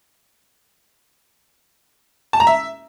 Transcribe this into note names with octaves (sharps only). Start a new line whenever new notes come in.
A5
A#5
E5